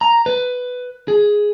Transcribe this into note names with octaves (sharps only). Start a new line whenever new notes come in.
A#5
B4
G#4